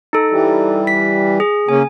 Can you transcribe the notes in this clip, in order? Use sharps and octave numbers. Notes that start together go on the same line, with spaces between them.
D#4 A4
E3 G3
B6
G#4
C#3 A#3 C#4 G#5